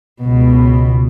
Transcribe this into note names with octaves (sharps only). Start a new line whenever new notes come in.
C#2 B2